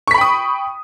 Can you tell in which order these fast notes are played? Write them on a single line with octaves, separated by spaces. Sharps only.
C#6 B6 B5 G5 D#6